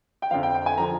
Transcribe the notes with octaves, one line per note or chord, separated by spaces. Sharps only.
G5
F2 D3 F3 F5
G5
G5
G#5
D3 F3 A#5